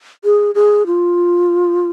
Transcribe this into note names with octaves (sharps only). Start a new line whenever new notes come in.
G#4
G#4
F4